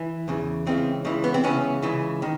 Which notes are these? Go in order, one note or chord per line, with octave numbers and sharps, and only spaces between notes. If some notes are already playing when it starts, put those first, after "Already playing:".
Already playing: E3
E2 C#3 E3
C#2 C#3 E3 C4
C#2 C#3 E3
B3
C4
C#2 C#3 E3 B3 C#4
C#2 C#3 E3
D#3